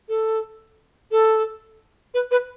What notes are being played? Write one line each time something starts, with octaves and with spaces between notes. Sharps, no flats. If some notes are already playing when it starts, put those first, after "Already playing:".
A4
A4
B4
B4